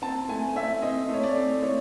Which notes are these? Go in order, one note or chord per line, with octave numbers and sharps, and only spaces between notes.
C4 A5
A3 G#5
C4 E5
C4 D#5
A3 C#5
D5
C4
A3 C#5